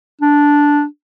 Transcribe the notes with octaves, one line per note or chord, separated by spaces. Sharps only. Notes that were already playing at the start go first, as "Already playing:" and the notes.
D4